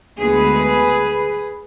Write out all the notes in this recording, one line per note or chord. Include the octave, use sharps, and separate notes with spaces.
D2 D3 G#3 B3 G#4 B4